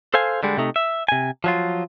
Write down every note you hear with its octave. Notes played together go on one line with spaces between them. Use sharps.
A4 C5 F5 G#5
D3 G3 G#3
C3 A3 D#4
E5
C3 G#5
F3 F#3 F4